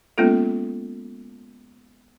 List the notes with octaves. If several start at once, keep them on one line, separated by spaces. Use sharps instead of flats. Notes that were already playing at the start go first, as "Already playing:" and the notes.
G#3 A#3 B3 C#4 F4 A4